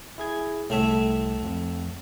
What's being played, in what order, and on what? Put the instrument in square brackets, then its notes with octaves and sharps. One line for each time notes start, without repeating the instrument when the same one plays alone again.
[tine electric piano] E4 G#4 G#6
[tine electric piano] C2 [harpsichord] A2 A3 E5
[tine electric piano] F2